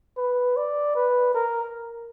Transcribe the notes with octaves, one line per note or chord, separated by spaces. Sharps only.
B4
D5
B4
A#4